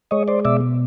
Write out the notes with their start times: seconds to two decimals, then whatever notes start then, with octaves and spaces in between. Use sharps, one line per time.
0.11 G#3 C#5 D#5
0.28 C5 D5
0.45 B2 D5 E5